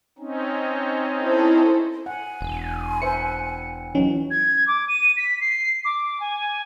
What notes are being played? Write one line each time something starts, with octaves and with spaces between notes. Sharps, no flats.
C4 C#4 D#4
E4 A4 C5
F#5 G#5
E1
B4 C5 E5 C#7
E3 F#3 C#4 D#4
G#6
D6
D#7
B6
C7
D6
G#5